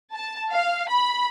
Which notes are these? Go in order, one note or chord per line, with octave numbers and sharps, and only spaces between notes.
A5
F5
B5